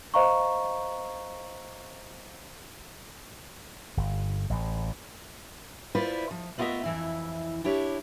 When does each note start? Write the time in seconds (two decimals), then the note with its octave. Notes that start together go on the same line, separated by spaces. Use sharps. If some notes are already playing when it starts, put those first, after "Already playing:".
0.14 C5 D#5 F5 A#5 C#6
3.97 G1
4.50 A1 A2
5.95 E4 F4 B4 C5 D5
6.31 F3
6.58 A3 B3 F4 A#4 D#5 E5
6.84 F2 E3 E4
7.64 D4 E4 G4 C#5